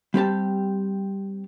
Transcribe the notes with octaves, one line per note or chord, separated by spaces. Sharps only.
G3 C4 G4 A5